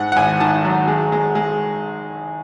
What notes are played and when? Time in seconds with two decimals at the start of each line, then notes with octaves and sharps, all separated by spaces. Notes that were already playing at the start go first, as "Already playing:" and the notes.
Already playing: G#2 F#5
0.12 F#5
0.16 G#1 G#5
0.40 D#3 A5
0.65 F#3
0.87 G#3
1.12 G#3
1.35 G#3